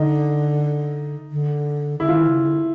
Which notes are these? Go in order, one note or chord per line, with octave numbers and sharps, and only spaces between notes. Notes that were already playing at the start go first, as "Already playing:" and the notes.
Already playing: D3 D#4
D3
D3 E4
D#3 F4
C#3
D3